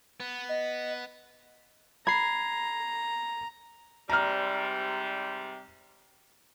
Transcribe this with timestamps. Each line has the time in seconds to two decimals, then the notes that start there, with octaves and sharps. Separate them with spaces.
0.20 B3
0.49 D#5
2.07 A#5 B5 G#6 C7
4.09 G#2 C3 G3 A#5 F6